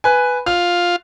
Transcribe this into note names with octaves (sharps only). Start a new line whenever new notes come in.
B4 G#5
F4 F6